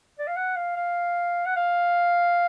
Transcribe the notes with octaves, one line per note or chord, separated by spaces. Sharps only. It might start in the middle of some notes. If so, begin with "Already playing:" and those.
D5
F5
F#5
F5
F5
F#5
F5